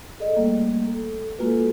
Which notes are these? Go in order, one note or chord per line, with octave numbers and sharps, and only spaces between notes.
G#4 A4 D5 D#5
G3 A3 A#3
A4
G#3 A#3 F4 F#4 A4 B4